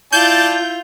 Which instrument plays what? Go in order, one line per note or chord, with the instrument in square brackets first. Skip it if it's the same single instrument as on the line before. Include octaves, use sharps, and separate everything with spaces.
[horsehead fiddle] E4 [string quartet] F4 [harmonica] D5 A5 [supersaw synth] G6